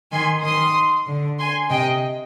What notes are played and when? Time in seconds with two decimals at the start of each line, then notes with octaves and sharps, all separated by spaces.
0.12 D#3 G#5 C6
0.43 D#3 C6 D#6
1.07 D3
1.39 G#5 C6
1.70 C3 D#5 G5